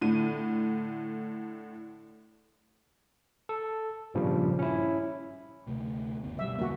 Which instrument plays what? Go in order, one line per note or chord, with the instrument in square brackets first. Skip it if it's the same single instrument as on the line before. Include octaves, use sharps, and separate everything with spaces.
[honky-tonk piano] A2 D3 D#7
[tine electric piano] A4
G#1 G2 A#2 C#3 F3 G3
C#4 E4
[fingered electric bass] D2 C3 A3
F#1 D2 B3
[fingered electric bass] B2 [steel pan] G3 E5
[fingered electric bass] E2 D3 C#4 [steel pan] A#3 F#4